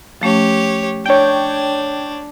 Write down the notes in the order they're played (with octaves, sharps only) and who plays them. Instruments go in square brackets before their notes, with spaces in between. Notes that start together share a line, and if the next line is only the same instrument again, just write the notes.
[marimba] F3 A3 C#4 [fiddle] G4 C#5
[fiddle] D4 [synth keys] C#5 G5